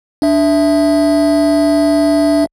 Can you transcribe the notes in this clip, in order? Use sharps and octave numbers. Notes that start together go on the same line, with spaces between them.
D4 E5